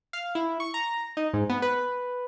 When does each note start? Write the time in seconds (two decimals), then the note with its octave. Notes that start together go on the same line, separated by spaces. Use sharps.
0.13 F5
0.35 E4
0.60 C#6
0.74 A#5
1.17 D#4
1.33 G#2
1.50 B3
1.62 B4